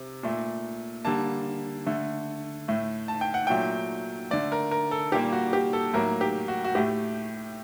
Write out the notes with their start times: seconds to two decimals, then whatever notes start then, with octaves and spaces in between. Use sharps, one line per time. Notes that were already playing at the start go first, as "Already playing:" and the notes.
Already playing: C3
0.23 A#2 A3
1.05 D3 G3 A#3 A5
1.86 D3 A3
2.68 A2 A3
3.08 A5
3.21 G5
3.34 F#5
3.47 A#2 F#3 A3 G5
4.31 D3 A3 D5
4.52 A#4
4.71 A#4
4.91 A4
5.12 A#2 G3 A#3 G4
5.32 F#4
5.53 G4
5.73 A4
5.93 A2 F#3 A#3 A#4
6.21 G4
6.48 F#4
6.64 F#4
6.75 A2 A3 G4